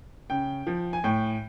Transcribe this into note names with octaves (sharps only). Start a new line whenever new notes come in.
C#3 G5
F3
G#5
A2 G5